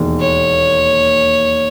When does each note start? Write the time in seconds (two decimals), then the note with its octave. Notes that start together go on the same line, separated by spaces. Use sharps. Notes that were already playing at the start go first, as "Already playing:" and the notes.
Already playing: E1 D#2 D#3
0.20 C#5